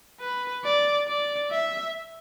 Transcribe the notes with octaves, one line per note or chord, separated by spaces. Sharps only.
B4
D5
D5
E5